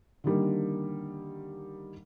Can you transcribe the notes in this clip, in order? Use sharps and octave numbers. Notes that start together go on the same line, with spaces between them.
D3 D#3 G3 A#3